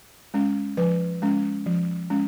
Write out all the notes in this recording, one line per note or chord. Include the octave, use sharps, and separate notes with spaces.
G#3 C#4
F3 B4
G#3 C#4
F3
G#3 C#4